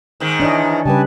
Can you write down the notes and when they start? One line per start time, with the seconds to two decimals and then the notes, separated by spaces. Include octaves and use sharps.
0.20 G#2 D#3
0.40 E3 D4 C#5 D#5
0.85 C#3 G3 G4 B4 G#5 A5